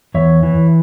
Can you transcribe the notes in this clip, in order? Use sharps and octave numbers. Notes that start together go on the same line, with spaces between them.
E2 C#5 E5
E3